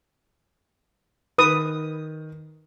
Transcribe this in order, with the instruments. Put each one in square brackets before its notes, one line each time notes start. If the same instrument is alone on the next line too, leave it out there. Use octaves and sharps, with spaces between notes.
[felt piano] D#3 [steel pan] B4 D#6